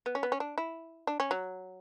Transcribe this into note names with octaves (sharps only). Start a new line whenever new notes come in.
B3
C#4
B3
C#4
D4
E4
D4
C#4
F#3